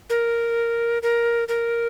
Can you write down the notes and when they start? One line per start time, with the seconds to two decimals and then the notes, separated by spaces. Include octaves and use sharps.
0.10 A#4
1.03 A#4
1.48 A#4